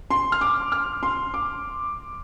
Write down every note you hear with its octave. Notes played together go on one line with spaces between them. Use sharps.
C6
F6
D6
F6
C6
D6